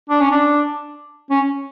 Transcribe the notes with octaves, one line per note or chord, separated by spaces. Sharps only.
D4
C#4
D4
C#4